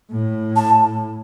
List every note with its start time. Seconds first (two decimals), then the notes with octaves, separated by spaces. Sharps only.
0.11 A2
0.56 A5